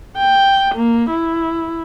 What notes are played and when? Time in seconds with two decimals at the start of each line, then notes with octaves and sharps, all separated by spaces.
0.18 G5
0.75 A#3
1.10 E4